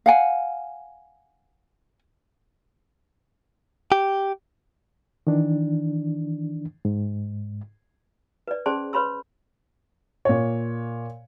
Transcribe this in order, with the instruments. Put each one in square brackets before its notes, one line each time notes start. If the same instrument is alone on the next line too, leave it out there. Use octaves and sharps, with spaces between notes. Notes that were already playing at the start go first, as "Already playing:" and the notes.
[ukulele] F5 F#5 G#5
[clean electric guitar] G4
[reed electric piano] D#3 E3 D4
G#2
[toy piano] B4 D5
C#4 G#4 C5 D5 A5 C6
B4 C#5 B5 C6 E6
[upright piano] A#2 C#5